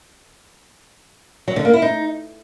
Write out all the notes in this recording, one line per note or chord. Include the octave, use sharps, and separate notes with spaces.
F#3
D3
A#3
E4
D#4